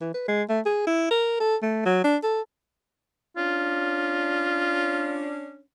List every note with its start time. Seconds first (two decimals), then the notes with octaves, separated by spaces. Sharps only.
0.01 E3
0.14 B4
0.28 G#3
0.49 A3
0.66 G#4
0.87 E4
1.11 A#4
1.40 A4
1.62 A3
1.85 F#3
2.04 D4
2.23 A4
3.37 C#4 D4 F4